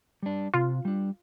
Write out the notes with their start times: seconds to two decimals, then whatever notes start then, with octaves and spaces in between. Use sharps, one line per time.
0.23 G3 D4
0.54 C3 F4
0.85 G3 D4